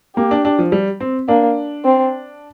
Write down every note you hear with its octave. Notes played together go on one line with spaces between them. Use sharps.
A#3 G4
D4
D4
F3
G3
C4
A#3 D4
C4